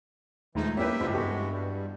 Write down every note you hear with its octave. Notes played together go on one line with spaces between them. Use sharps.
A#1 D#2 E3 F3 G#3 A3 D#4
F#2 A#3 E4 G4 B4 C#5 E5
F#1 C#2 G2 F4 C5
E3 G#3 B3 F#4 G4 A4
G3